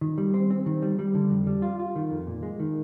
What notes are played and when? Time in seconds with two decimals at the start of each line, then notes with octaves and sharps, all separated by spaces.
0.01 D#3
0.18 G3
0.34 C4
0.50 C4
0.66 D#3
0.82 G3
0.99 G3
1.15 D3
1.30 F2
1.47 G3
1.62 F4
1.79 F4
1.96 D#3
2.11 F2
2.27 A#2
2.43 G#3
2.60 D#3